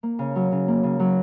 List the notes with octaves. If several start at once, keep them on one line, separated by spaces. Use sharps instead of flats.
A#3
C#3
F#3
C#3
A#3
C#3
F#3